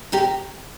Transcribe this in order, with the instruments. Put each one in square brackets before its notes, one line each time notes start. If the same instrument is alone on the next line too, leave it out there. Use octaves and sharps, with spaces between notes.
[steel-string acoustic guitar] D2 G4 A#4